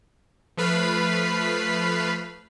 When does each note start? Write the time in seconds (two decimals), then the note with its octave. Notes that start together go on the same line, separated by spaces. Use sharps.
0.57 F3 A3 B4 B5 F6 C7